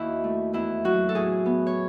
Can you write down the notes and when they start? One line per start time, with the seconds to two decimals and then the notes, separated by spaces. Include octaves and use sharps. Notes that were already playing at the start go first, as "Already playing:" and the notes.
Already playing: D#2 E4 F#4
0.24 A3
0.53 E2 E4
0.84 F#3 F#4
1.09 A4
1.15 A2 G#4
1.46 B3
1.67 C#5